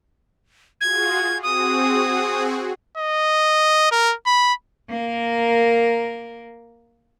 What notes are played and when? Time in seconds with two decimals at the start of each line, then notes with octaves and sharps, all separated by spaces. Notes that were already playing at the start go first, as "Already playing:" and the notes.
0.81 F4 F#4 G#4 G#6
1.43 C4 F#4 G#4 D#6
2.98 D#5
3.91 A#4
4.26 B5
4.89 A#3 A#4